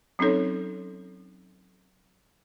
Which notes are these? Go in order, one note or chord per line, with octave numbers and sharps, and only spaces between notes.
F#3 C4 C#4 D#4 A4 C#5